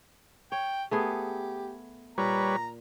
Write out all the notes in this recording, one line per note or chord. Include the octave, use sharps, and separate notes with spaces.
C#5 G5
A3 B3 G4 G#4
A#2 G3 B4 C#5 A#5